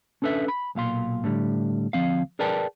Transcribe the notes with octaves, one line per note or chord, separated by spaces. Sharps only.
C#4 D4 A4 B4 E5
B5
B1 A#2 F5 C6
A2 D3 G3
D2 F3 C4 F5
G#4 A#4 B4 D5 G5 A5